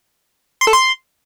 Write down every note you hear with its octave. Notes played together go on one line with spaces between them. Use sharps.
C6
A4
C6